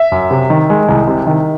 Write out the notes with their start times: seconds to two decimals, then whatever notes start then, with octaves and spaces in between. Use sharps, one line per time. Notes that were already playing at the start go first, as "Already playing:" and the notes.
Already playing: E5
0.12 F#2
0.31 C3
0.50 D#3
0.70 G#3
0.89 C2
1.08 C3
1.27 D#3